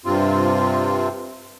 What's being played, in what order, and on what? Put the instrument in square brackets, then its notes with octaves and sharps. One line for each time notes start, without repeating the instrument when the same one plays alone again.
[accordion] G2 C3 C4 F4